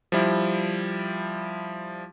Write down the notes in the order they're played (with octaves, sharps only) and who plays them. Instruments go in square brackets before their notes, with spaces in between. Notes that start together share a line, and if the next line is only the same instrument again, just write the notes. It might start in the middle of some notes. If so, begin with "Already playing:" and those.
[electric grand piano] F3 G3 E4